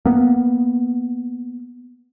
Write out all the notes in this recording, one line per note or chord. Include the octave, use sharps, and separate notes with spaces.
A#3 B3